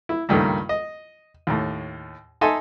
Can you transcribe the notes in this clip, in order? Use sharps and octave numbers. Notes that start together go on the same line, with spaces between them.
E4
C#2 G2 D#3 A3 A#3
D#5
D#2 A2
D#4 A4 E5 G#5 C6